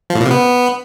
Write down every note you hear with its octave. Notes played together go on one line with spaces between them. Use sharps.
F3
A2
A#2
C3
B3